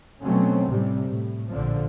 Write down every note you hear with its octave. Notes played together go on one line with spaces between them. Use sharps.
B2 F#3 A3 C4 C#4
A2 C3 G3
A2
A#1 D3 F3